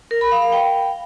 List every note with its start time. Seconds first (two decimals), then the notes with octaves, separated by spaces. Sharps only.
0.11 A#4
0.21 B5
0.32 F5
0.42 F5
0.52 G5